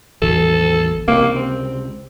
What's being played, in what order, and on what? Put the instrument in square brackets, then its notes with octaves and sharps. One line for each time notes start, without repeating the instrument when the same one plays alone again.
[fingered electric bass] A1 E2 D#3 [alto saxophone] A4
[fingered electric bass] C#2 C3 [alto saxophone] A#3
[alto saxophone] C4